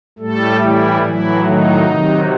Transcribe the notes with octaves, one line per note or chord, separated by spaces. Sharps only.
A2 G3 A3 A4
E3 E4
A2 E3 F#3 E4
D#3 D#4
C3 D#3 F#3